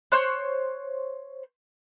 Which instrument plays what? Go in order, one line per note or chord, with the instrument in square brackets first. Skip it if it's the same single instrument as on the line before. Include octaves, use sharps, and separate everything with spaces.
[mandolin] C5 C#5 C6 F#6